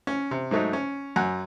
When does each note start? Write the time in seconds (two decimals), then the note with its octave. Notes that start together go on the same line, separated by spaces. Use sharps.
0.07 C#4
0.31 C3
0.51 G#2 F#3 A3 D#4
0.73 C#4
1.16 F#2 F#5 G#5